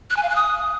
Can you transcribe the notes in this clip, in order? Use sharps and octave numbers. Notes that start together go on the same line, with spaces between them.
F#6
G#5
F5
F#6
D#6